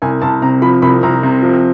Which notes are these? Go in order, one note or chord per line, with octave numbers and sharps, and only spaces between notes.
C2 G#5
C2 A5
C3 A#5
F3 B5
C2 B5
C2 A#5
C3
F3